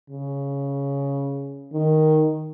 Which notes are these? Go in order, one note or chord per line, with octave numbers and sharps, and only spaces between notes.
C#3
D#3